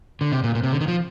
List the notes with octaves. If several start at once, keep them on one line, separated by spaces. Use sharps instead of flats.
D3
C3
A#2
A#2
C3
D3
D#3
F3